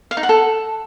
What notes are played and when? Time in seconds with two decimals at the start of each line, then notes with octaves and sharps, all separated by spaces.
0.11 F5
0.17 D#4
0.23 F#5
0.29 A4